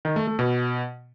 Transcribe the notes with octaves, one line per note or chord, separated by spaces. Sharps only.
D#3
A3
A3
B2